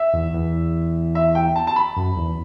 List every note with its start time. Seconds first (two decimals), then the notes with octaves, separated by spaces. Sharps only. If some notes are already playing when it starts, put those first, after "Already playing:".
Already playing: E5
0.13 E2
0.33 E2
1.15 E5
1.35 G5
1.56 A5
1.67 A5
1.76 B5
1.96 F#2
2.17 E2